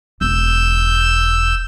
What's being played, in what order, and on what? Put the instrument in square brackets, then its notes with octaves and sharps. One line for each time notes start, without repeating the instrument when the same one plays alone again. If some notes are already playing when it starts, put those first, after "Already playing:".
[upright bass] E1 [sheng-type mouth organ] E6 G6